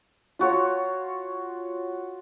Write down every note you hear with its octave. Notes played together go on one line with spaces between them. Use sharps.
F4 F#4 C#5